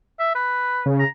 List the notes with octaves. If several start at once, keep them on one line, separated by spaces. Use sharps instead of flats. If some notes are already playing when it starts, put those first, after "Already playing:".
E5
B4
C#3
A#5